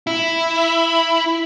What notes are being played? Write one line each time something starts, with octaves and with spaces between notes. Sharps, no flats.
E4